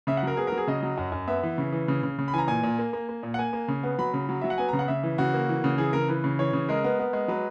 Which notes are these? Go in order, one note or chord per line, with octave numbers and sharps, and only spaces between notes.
C#3 E5
F#5
F#3 A#4
B3 G#4
A#4
F#3
G#4
C#3 D#5
F#3
F#2
F#2
B3 E5
E3
C#3
E3
C#3
C#3
C#3
B5
E3 G#5 A#5
A#2 G#5
A#2
A#3
A#3
A#3
A#2
F#5
A#3 G#5
A#3
C#3
B3
F#3 B5
C#3
F#3
F#3 E5
F#5
B3 G#5
A#5
C#3
F#5
C#3 E5
E3
C#3 F#4
A#3
E3
C#3
E3 G#4
C#3 A#4
E3 B4
C#3
E3 C#5
C#3
G#3 A#4
B3
B3
G#3
F#3 B4